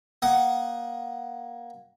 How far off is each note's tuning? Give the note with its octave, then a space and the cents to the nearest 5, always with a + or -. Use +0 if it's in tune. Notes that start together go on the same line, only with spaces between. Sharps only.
A#3 +20 F#5 +20 D#6 +0